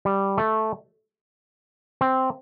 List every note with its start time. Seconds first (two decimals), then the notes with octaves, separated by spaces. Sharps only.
0.05 G3
0.38 A3
2.01 C4